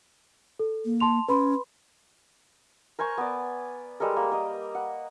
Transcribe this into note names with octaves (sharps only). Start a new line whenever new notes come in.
A4
A#3
A5 C6 F7
C#4 B4 B5 C6
A#4 C5 G#5 C#6
B3 D5
G3 G#3 A4 A#4
A#3
A#4 D#5
F#5